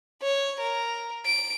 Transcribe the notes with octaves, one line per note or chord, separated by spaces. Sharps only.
C#5
A#4
D7